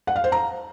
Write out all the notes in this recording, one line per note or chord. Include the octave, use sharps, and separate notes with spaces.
F#5
F5
C5
A#5